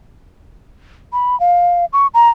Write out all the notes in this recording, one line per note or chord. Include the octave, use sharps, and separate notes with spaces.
B5
F5
C#6
A#5